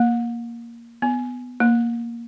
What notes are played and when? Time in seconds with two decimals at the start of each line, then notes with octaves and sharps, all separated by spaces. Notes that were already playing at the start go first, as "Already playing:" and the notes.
Already playing: A#3
1.02 B3
1.60 A#3